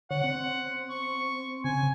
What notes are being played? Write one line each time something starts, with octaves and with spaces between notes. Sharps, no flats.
D3 C#5 F#5
C4
C#6
C#3 G#5